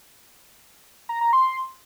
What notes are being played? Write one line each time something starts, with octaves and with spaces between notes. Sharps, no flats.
A#5
A#5
C6